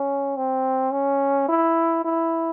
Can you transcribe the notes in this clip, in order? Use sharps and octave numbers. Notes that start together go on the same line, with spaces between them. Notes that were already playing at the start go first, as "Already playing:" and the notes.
Already playing: C#4
C4
C#4
E4
E4